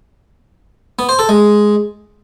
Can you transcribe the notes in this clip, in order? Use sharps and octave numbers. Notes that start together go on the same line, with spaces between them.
B3
C5
A4
G#3